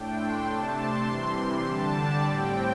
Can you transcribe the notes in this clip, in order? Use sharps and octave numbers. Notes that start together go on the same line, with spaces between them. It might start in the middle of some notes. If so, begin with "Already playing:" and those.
Already playing: A2 A3 D4 G5
C6
C3 A3 D4 A5
C6
C3 E3 G3
D3 G3 D4 A5
D5
A2 G3 C4 G5